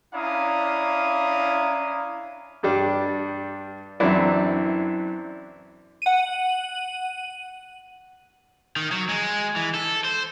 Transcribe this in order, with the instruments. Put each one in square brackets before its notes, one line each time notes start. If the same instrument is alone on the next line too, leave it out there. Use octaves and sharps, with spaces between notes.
[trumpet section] C#4 D4 E4 F5 A#5 D#6
[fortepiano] G2 G3 D4
F#2 E3 C4 D4 E4
[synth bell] F#5 D#7
[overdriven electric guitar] D#3
F#3
G#3
E3
A4
C5